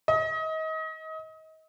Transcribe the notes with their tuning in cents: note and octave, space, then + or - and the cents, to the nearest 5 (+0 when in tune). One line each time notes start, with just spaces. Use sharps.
D#5 +30